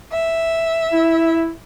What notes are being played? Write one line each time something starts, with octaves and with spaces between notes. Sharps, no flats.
E5
E4